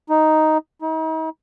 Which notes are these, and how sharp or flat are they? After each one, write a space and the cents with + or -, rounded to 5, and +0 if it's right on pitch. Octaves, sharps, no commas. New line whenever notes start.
D#4 +5
D#4 +40